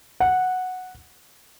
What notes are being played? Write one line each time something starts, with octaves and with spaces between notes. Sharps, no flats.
F#5